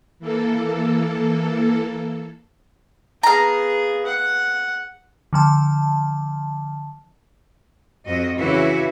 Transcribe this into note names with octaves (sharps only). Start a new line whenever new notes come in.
E3 A#3 A4
B3 G#4 F5 A#5
F#5
D3 F3 A5
F2 F#4 D#5
C#3 E3 E4 F#4